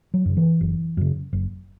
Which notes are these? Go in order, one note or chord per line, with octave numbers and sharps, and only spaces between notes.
F#3
F#2 C#3
E3
F#1
F#2 C#3
F#1